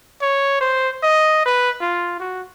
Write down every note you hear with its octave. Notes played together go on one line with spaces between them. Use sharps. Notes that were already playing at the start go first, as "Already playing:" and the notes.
C#5
C5
D#5
B4
F4
F#4